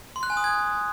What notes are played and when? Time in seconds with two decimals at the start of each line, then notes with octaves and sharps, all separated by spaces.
0.16 C6
0.23 F#6
0.30 G#5
0.37 D#6
0.44 G#6